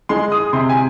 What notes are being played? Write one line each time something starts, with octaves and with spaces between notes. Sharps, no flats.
G#3 C6
D#6
C3 C6
G#5